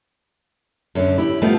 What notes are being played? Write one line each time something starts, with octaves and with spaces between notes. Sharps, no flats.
F#2 D3
E4 G4
D#3 F3 G3 A3 B3